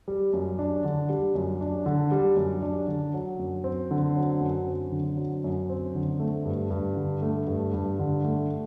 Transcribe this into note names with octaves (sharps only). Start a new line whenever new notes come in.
G3
F#2
D4
D3
G3
F#2
D4
D3
G3
F#2
D4
D3
F#3
F#2
C4
D3
F#3
F#2
C4
D3
F#3
F#2
C4
D3
A3
G2
G2
D3
A3
G2
G2
D3
A3